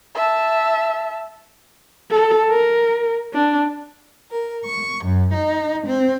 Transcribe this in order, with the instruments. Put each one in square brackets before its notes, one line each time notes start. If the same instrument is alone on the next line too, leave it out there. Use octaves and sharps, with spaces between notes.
[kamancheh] E5 A5
[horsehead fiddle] A4
A#4
D4
[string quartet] A#4
C#6
F#2
D#4
C4